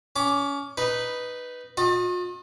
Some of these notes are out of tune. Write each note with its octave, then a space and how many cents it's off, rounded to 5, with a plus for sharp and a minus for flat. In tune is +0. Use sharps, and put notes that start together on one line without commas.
C#4 +25 D6 +0
D#4 -5 B4 +0
F4 +45 D#5 +0